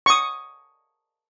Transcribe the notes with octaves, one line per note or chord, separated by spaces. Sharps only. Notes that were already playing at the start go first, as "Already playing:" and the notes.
C#6 D#6